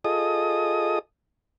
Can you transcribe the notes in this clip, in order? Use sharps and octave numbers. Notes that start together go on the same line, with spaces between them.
F4 G#4 A4 D#5 D#6